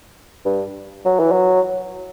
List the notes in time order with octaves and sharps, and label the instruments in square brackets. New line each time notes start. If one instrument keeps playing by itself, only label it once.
[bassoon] G2
F#3
E3
F#3